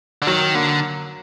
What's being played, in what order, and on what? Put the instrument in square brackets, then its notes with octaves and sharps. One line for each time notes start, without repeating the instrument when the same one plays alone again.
[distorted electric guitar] D3
[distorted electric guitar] D#3 [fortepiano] F#3
[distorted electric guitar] D3 [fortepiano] A#3